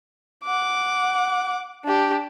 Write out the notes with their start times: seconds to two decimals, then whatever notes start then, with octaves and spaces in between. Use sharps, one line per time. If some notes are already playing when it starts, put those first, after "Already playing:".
0.44 F#5 D6
1.84 D4 G4